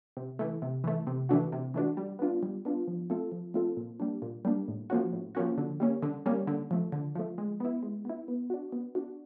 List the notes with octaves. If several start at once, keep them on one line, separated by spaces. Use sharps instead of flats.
C3
E3 A3
C3
E3 A3
C3
E3 A3 D4 F#4
C3
E3 A3 D4 F#4
G3
B3 D4 F4
G3
B3 D4 F4
F3
A3 C4 F4 A4
F3
A3 C4 F4 A4
A#2
G3 A#3 D4
A#2
G3 A#3 D4
A2
F3 A#3 C#4 F#4
A2
F3 A#3 C#4 F#4
D3
G3 A#3 C#4
D3
G3 A#3 C#4
D3
F3 A3
D3
F3 A3
G#3
B3 E4
G#3
B3 E4
B3
D4 F#4
B3
D4 F#4